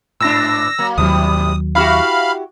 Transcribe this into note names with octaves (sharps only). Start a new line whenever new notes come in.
G#2 D4 E6 A#6
F#3 A#3
D#2 G#2 C3 F#3 G3 D#6
E4 F#4 G4 F5 B5 F6